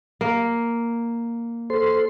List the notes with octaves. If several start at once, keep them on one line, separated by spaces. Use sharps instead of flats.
A#3
A4 C5 C6